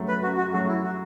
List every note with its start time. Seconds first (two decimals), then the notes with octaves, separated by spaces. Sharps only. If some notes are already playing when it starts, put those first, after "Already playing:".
Already playing: F#2 F#3 A3
0.08 B4
0.23 F#2 F#4
0.37 F#4
0.53 F#3 A3 F#4
0.68 E4
0.84 F#4